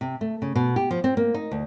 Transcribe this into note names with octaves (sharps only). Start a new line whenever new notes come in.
C3
A3
C#3
B2
G4
F3
C4
A#3
D#4
D2